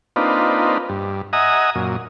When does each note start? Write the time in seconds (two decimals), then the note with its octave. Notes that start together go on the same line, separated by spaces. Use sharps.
0.16 A#3 C4 D4 D#4 F4 B4
0.89 G2
1.33 D#5 E5 F#5 G#5 A#5 D#6
1.75 F#2 A#2